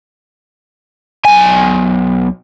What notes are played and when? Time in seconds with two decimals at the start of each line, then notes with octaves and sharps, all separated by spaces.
1.25 B1 G#5